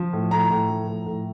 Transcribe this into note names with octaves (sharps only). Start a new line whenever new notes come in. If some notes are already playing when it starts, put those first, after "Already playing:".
Already playing: F3
A2
A2 A#5
A2
F3
A2
A2